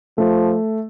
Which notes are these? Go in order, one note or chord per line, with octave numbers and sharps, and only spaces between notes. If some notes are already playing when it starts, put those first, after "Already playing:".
F3 A3